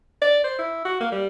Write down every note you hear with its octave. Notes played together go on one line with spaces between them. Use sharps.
D5
C5
E4
F#4
A#3
G3